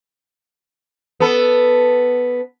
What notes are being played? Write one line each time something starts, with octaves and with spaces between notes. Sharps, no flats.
B3 A4